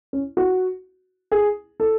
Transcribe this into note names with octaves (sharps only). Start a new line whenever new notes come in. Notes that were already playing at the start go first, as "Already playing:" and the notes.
C#4
F#4
G#4
A4